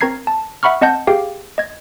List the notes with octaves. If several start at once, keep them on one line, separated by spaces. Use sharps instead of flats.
C4 A#4 A#5 G#6 C7
A5
E5 F#5 B5 C#6 F6
C4 D#5 F#5 A5 G6
G4 G#4 F5 G5
D#5 G#6